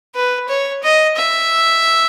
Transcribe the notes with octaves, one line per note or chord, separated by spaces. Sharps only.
B4
C#5
D#5
E5